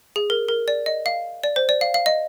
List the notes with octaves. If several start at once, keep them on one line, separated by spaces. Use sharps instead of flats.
G#4
A#4
A#4
D5
D#5
F5
D5
C5
D5
F5
F5
D#5